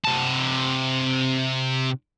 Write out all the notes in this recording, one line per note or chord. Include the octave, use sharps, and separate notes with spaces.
C3 A5